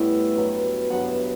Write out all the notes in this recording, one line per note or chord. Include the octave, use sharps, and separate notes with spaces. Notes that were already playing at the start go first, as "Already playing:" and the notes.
Already playing: A2 G3 B3 E5
G2 F#3 B3
G2 F#3 B3 F#5
E5